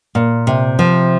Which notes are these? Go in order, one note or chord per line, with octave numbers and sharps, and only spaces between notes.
A#2
C3
F3